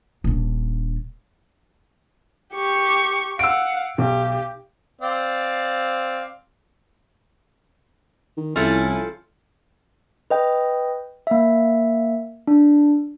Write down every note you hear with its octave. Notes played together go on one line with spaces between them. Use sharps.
D#1 D4
G4 C#6
F5 F#5 E6 D7
B1 G4
C4 D5 F5
D#3
C2 F3 C#4 E4 A4
B4 D#5 G5
A#3 E5
D4